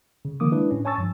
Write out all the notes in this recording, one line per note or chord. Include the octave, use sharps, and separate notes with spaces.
C#3
D#3 F3 A#3 D6 D#6
G#3 D4 E4 B4
A2 C#4
C#5 G#5 A5 C#6 E6 A6
G2 F3